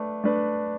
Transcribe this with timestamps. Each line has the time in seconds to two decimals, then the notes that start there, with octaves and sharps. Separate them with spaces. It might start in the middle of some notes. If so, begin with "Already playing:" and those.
Already playing: A3 D4 B4
0.24 A3 D4 B4